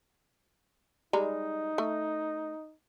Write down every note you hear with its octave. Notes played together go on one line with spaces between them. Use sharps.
G3 G#3 D#4 A#5
A3